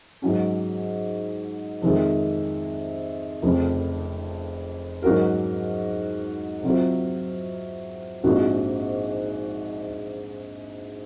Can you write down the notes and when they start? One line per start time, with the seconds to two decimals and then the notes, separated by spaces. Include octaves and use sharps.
0.22 G#2 F#3 C#4
1.82 F2 C3 D#3 G#3
3.42 F1 F2 C#3
5.02 G#2 F#3 C#4 F#4 A#4
6.63 C3 F#3 C4 F4
8.24 A#1 G#2 F3 C4 F#4